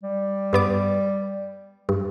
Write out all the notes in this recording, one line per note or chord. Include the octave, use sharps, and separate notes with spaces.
G3
G2 B3 D6
G2